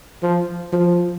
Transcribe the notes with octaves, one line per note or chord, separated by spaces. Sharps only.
F3
F3